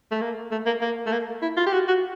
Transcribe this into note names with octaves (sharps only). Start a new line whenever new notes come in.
A3
A#3
A3
A#3
A#3
A3
A#3
E4
F4
G4
F#4
F#4